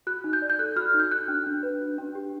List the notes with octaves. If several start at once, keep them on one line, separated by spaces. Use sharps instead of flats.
F#4 F#6
D#4
G6
D5
G6
A4 F#6
F#4 F6
D#4
G6
F#4 F#6
D4
D4
B4
F#4
D4
G4